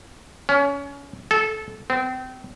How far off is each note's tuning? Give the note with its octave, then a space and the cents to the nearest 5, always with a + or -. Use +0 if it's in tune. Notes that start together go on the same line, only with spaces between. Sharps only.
C#4 +25
A4 -20
C4 -30